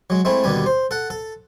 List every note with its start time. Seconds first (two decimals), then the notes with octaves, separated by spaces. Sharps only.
0.10 F#3 G#3
0.25 G#3 A3 C4 E4
0.44 D#2 B2 D3 G3 G#5
0.66 C5
0.91 A4 F#5
1.10 A4